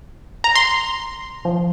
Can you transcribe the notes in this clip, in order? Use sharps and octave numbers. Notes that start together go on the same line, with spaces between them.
A#5
C6
F3